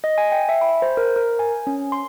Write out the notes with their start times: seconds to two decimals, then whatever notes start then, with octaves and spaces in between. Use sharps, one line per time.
0.04 D#5
0.18 G#5
0.32 G5
0.49 E5
0.61 B5
0.82 C5
0.97 A#4
1.16 A#4
1.39 G#5
1.67 C#4
1.92 C6